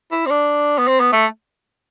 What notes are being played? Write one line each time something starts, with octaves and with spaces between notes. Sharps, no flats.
E4
C4
D4
B3
C4
B3
A3